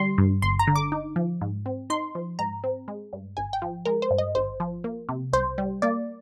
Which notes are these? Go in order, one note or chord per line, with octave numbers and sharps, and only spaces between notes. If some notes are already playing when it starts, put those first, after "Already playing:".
Already playing: D3 G3 C6
G2
G1 C6
A#5
D3
D6
D#4
F3
G#2
C4
D#4 C6
F3
G#2 A#5
C4
G#3
G2
G#1 G#5
G5
F3
G#3 A#4
C5
G2
D#5
G#1 C5
F3
A#3
C3
C2 C5
G3
A#3 D5